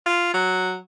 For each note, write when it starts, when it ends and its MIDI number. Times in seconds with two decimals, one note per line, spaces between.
0.06 0.30 65
0.34 0.76 54